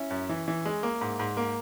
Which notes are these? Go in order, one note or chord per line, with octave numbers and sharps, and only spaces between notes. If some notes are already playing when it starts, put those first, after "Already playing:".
Already playing: C#4 E4
F#2
E3
E3
G#3
A#3
G#2
G#2
A#3